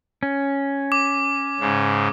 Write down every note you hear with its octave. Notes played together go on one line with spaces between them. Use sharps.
C#4
D6
G#2 C#3